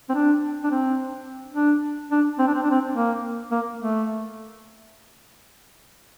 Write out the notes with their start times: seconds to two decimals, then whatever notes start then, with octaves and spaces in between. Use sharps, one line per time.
0.09 C4
0.15 D4
0.64 D4
0.71 C4
1.54 D4
2.11 D4
2.39 C4
2.47 D4
2.54 C4
2.63 D4
2.71 C4
2.95 A#3
3.51 A#3
3.79 A3